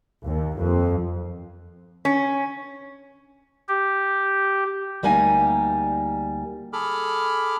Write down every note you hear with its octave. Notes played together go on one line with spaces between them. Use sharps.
D#2
F2
C#4
G4
D2 G3 A#3 D#4 G#5
G#4 A4 B5 D6 F6